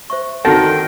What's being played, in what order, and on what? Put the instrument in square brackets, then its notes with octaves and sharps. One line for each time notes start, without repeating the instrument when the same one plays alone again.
[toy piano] C5 E5 C#6
[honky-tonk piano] D3 D#3 A#6 [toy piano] F#4 F#5 [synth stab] A4 [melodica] G5